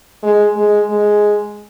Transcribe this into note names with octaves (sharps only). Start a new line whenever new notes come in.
G#3
G#3
G#3